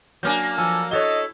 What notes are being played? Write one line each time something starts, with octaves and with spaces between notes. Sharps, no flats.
F#3 A#3 D4 G#5 F6 G6
F3 A4 G#5
E4 F#4 A4 C#5 D#5 G7